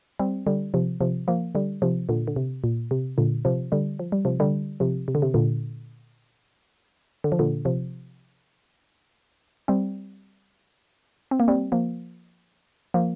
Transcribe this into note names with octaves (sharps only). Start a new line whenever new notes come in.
G3 C4
D3 G3
C3 F3
C3 F3
F3 A#3
D3 G3
C3 F3
A#2 D3
D3
C3
A#2
C3
A#2 D3
C3 F3
D3 G3
F3
G3
C3 F3
D3 G3
C3 F3
C3
D3
C3
A#2 D3
D3
F3
A#2 D3
C3 F3
G3 C4
C4
A#3
G3 C4
F3 A#3
F3 A#3